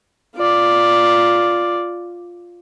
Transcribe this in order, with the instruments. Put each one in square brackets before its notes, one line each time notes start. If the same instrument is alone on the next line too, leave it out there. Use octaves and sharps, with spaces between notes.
[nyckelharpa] F4 D5